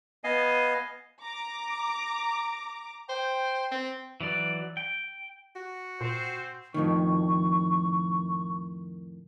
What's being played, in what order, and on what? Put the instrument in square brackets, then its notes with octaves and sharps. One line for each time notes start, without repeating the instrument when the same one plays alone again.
[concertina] B3 D#5 F5 G#5
[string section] A#5 D6
[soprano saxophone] C5 [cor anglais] G5
[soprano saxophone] C4
[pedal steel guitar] E3 F#3 D5
G5
[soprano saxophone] F#4
[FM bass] A#2 [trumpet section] C4 C5
[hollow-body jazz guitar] F2 A2 D#3 [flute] C#6